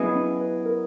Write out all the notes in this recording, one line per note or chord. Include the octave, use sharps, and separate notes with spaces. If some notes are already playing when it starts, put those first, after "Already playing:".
Already playing: F#3 B3 C#4 E4 G#4 D#5
C#4
B4
A#4